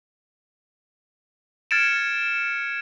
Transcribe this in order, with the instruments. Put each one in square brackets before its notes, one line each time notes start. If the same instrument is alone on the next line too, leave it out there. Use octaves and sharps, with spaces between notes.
[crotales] F6 G#6 A6 C#7 D7 E7